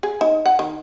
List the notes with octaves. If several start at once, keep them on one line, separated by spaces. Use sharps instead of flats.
G#4
D#4
F#5
D#3